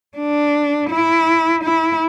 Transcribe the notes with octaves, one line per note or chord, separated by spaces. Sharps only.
D4
E4
E4